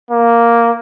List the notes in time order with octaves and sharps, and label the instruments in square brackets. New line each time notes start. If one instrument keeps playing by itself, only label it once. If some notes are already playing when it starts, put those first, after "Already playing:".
[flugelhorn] A#3